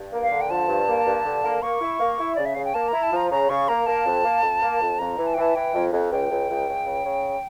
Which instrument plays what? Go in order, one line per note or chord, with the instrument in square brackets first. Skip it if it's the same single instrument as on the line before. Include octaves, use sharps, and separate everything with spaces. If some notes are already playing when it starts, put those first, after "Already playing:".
Already playing: [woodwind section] G2
A#3
[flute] F5
[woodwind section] D3
[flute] G5
[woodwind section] F3 [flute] A5
[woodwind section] G2
A#3
G2
D3
A#3
[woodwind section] A#3 [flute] C#6
[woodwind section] E4
A#3
E4
[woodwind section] C#3 [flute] D5
[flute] E5
[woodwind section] C#3 [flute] F5
[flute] G5
[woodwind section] A#3 [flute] A5
[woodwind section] E4 [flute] A#5
[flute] A5
[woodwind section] F3 [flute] A#5
[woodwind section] C#3 [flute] A#5
[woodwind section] C#3 [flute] C#6
[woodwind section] A#3 [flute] A#5
[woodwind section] A#3 [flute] A5
[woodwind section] F2
A#3
F2
A#3
F2
[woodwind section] F2 [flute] A#5
[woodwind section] E3
[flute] A5
G5
[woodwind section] E3 [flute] A5
[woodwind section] E3 [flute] G5
[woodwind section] F2
F2
[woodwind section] C#2 [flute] G5
[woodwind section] C#2
C#2
C#2
C#3
C#3